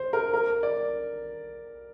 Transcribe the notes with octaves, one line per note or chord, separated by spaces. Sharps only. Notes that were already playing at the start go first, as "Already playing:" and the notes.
Already playing: C5
A#4
A#4
D5